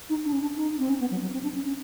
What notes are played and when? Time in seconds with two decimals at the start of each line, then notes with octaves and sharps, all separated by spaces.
0.10 D#4
0.25 D4
0.33 C#4
0.42 D4
0.57 D#4
0.79 C4
0.89 C#4
1.00 B3
1.11 F#3
1.22 F#3
1.33 C4
1.43 D4
1.54 C#4
1.65 C#4